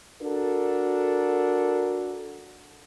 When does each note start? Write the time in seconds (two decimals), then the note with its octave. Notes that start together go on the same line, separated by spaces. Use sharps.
0.21 D4 F#4 A4 A#4